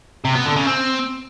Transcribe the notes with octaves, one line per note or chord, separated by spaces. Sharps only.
C3
B3
D3
C#3
C4